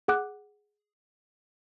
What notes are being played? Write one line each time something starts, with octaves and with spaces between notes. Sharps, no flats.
G#4 F#5 D6 F#6